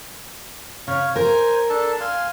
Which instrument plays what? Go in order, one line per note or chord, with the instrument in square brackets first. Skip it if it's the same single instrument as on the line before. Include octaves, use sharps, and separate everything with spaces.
[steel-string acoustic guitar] C#3 [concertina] C#5 F5
[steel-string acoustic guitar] A#4 [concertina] C5 G#5
[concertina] D4 A4 A5
F5 G#5 C6